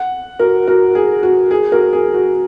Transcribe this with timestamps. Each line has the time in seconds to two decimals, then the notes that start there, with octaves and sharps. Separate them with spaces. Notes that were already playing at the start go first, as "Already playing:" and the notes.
Already playing: F#5
0.39 F#4 A#4
0.67 F#4 A#4
0.95 G#4
1.23 F#4
1.51 G#4
1.72 F#4 A#4
1.93 G#4
2.14 F#4